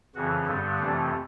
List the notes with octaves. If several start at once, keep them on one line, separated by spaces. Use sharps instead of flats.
F2 C#3 E3 F#4
G2 D3 G3 B3
F2 C3 E3 A3 D4